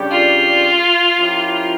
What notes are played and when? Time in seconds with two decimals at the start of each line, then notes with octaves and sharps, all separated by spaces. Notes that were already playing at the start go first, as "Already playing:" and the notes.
Already playing: C#3 G3 D4 G4 C#5
0.11 F4
1.17 F3 C#4 E4 G4 A#4